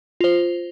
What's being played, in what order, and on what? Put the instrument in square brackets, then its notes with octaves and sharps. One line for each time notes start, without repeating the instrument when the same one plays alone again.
[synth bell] F4 C5